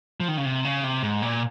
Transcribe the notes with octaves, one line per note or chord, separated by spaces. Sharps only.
F3
D#3
C#3
C3
C#3
C3
G#2
A#2